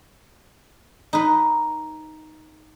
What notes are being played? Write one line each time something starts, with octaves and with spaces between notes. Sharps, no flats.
D#4 B4